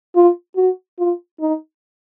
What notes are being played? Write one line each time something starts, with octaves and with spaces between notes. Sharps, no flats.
F4
F#4
F4
D#4